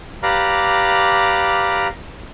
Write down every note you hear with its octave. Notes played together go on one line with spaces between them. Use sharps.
G4 B4 D5 F5 A#5